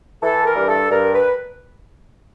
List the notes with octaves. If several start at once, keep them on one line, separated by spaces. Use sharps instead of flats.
E3 A4
A#4
G2
A4
G2 A#4
B4